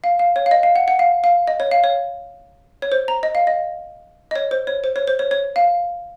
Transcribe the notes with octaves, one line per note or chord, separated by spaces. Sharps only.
F5
F5
C#5
F5
D#5
F5
F#5
F#5
F5
F5
D#5
C#5
F5
C#5
C#5
C5
A#5
D#5
F5
D#5
D#5
C#5
C5
C#5
C5
C#5
C5
C#5
C#5
F5